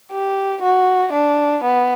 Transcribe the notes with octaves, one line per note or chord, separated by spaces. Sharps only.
G4
F#4
D4
B3